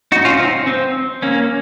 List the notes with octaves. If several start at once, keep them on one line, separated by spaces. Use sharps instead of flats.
D#4 F#4
C#4 F4
C4 D#4
C4
A#3 C#4